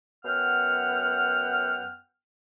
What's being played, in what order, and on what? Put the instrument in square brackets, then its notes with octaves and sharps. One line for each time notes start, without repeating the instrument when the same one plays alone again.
[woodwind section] F#2 B3 F#5 G5 F6